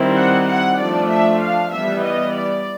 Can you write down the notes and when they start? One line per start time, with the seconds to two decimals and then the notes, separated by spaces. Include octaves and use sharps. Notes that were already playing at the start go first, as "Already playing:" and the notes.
Already playing: D#3 G3 C4 E4
0.16 F#5
0.47 F#5
0.78 F3 A3 D4 D5
1.09 E5
1.40 F5
1.71 E3 G3 B3 E5
2.02 D#5
2.33 D5